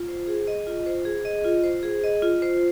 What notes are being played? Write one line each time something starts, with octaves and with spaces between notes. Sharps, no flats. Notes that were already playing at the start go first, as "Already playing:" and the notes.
Already playing: F4
C5
G#4
D#5
F4
C5
G#4
D#5
F4
C5
G#4
D#5
F4
C5